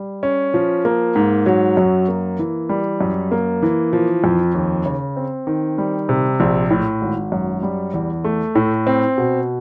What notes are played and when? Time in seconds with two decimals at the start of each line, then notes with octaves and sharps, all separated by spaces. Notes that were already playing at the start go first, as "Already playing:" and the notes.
Already playing: G3
0.23 C#4
0.54 F3
0.85 A#3
1.15 G#2
1.46 F#3
1.77 F#2
2.08 A#3
2.39 E3
2.69 G3
3.01 F#2
3.31 A#3
3.62 E3
3.93 F3
4.24 F2
4.55 D#2
4.86 C#3
5.16 C4
5.47 D#3
5.78 G3
6.09 C3
6.40 A#1
6.70 A2
7.01 G#1
7.32 F#2
7.63 G3
7.94 E2
8.24 A3
8.55 A2
8.87 C4
9.18 B2